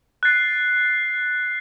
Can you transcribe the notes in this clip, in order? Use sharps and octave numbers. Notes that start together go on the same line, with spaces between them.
F#6 A6 C7